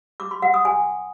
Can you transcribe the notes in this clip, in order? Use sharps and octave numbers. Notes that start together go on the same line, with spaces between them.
D6
C6
F#5
D#6
G#5